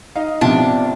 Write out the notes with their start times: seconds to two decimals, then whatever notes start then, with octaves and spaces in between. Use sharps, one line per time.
0.16 D#4 D#5 F5
0.41 G#1 C3 F3 B3 D4